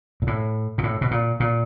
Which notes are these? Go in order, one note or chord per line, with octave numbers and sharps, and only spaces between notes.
A#2
A2
A#2
A2
B2
A#2
A#2